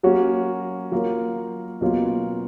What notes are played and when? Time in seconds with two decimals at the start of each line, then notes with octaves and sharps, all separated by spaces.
0.03 F#3 A#3 C#4 F#4
0.92 F#3 A#3 F4 A#4
1.81 B2 F#3 A#3 C#4 F4